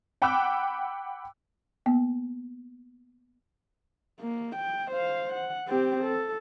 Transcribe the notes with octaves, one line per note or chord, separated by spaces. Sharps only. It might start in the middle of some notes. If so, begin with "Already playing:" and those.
F#5 G5 B5 D6 E6 F#6
A#3 B3 G5
A#3
G5
C5 F5
F#5
C4 G4
A4